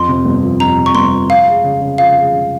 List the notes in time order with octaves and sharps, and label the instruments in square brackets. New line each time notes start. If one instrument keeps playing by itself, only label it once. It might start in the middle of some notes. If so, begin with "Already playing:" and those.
Already playing: [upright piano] F2 [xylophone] C6
[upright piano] C3
G1
F3
[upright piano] F2 [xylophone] A#5
[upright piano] C3
[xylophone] C#6
[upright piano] G1 [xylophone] C6
[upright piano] F3
[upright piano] F3 [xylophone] F5
[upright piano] G#3
C#3
C#3
[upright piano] F3 [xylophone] F5
[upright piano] G#3
C#3